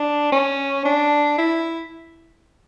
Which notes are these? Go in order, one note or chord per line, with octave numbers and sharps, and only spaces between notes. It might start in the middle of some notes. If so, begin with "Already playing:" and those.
Already playing: D4
C#4
D4
E4